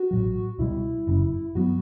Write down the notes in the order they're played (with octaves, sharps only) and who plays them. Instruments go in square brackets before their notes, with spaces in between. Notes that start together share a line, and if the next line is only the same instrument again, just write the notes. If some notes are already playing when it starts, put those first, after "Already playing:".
Already playing: [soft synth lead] F#4
[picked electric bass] A1 A2 F#3
[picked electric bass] C#2 B2 G3 [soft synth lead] E4
[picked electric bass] F#1 F#2 C#3
[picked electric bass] G2 F#3 B3 [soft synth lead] F#4